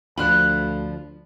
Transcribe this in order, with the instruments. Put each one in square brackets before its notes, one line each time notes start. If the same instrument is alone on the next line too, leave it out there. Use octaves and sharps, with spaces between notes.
[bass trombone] D2 [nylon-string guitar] F3 D4 F4 [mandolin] B5 F6 F#6